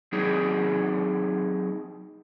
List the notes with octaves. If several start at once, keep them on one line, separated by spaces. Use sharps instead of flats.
F#3 C4 D#4 G#4